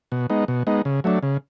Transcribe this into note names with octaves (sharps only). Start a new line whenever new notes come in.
B2
G#3 B3 D#4
B2
G#3 B3 D#4
C#3
F#3 A3 D4
C#3